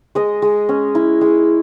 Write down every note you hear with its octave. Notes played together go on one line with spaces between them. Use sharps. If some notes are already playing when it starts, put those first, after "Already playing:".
G#3 D#5
G#3
C#4
E4
G#3